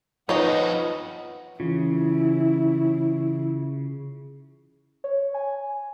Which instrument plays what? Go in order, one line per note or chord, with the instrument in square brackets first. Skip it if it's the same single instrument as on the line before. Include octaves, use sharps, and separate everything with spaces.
[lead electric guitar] F3 D#5 [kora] D#4 [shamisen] F4 C#5 [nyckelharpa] B4 F#5
[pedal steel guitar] C#3 [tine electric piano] E3 F4 [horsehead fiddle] E4
[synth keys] C#5
G#5